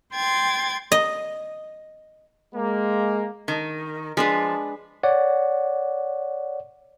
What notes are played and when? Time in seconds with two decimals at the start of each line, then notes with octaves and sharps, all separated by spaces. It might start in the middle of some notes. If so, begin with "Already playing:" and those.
0.13 G5 C6 G#6 A6
0.92 D#5
2.55 G#3 A#3
3.48 D#3
4.17 F3 G#3 D4 B4
5.03 C#5 D5 F#5